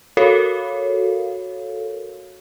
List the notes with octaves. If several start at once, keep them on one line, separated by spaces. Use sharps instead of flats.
F#4 A4 A#4 C#5 F5